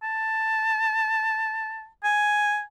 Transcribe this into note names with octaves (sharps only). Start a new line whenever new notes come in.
A5
G#5